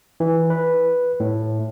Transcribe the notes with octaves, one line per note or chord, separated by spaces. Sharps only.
E3
B4
A2